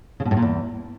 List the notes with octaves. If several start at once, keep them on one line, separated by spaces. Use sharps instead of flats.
C#3
B2
A2
A#2
E2